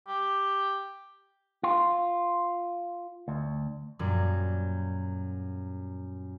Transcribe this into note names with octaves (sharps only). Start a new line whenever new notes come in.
G4
F4
D2
F#2 A#2 F#3 G3